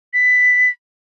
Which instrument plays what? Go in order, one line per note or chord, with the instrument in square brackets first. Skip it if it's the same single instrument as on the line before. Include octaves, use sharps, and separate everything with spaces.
[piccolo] B6